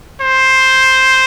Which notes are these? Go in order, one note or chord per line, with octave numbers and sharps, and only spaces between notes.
C5